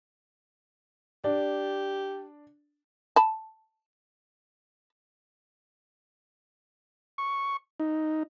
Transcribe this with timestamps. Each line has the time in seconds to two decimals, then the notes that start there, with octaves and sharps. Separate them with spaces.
1.24 D4 G4 D5
3.16 A5 B5
7.18 C#6
7.80 D#4